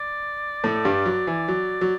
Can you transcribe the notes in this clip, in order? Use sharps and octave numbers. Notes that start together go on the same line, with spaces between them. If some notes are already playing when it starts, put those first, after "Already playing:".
Already playing: D5
A2 A3
G2 G3
F#3
E3
F#3
F#3